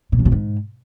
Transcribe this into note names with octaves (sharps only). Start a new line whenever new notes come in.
A#2
F#2
B2
G#2